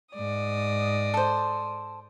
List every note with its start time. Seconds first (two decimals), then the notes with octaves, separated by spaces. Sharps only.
0.15 G#2 D5 D#6
1.14 A4 C5